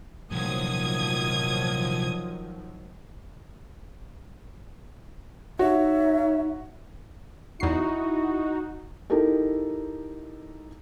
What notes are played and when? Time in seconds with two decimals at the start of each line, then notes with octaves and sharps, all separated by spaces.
0.32 C2 A#2 D#3 F3 F#3 D#6 G#6
5.59 D#4 F#4 C#5 E5
7.60 E2 D#4 E4 F#4 C7
9.10 D#4 E4 G4 A4 A#4